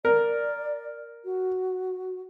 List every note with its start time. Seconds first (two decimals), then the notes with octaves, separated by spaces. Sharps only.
0.05 A#4 D5
1.25 F#4